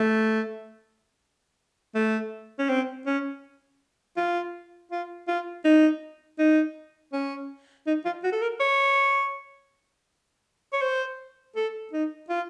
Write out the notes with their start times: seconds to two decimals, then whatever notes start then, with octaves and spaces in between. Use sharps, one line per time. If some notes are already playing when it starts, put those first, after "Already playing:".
Already playing: A3
1.95 A3
2.59 C#4
2.69 C4
3.07 C#4
4.17 F4
4.92 F4
5.28 F4
5.65 D#4
6.39 D#4
7.13 C#4
7.87 D#4
8.05 F4
8.24 F#4
8.32 A4
8.42 A#4
8.60 C#5
10.73 C#5
10.82 C5
11.56 A4
11.93 D#4
12.30 F4